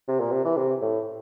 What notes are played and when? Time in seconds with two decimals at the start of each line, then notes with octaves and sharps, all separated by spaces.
0.08 C3
0.20 A#2
0.32 C3
0.45 E3
0.57 C3
0.81 A2